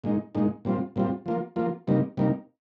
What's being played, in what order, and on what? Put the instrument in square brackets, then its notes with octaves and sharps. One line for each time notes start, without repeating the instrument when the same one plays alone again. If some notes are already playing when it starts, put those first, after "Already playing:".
[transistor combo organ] A#2 G#3 D#4
A#2 G#3 D#4
A#2 G3 C4 F4
A#2 G3 C4 F4
F3 A#3 F4
F3 A#3 F4
C3 G3 A#3 D#4
C3 G3 A#3 D#4